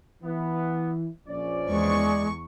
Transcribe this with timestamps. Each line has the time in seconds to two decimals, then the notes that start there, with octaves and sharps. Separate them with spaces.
0.23 E3 B3
1.28 A#1 F3 C#4 D5
1.68 E2 G#3 C#6